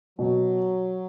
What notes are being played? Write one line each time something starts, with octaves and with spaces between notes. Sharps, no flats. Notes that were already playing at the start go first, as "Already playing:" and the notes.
B2 F#3